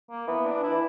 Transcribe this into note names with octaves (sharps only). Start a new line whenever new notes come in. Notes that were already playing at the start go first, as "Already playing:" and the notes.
A#3
E3 B3
D4
E4
E3